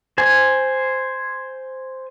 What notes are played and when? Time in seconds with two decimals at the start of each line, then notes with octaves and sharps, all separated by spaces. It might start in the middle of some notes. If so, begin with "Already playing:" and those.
0.18 C5 G#5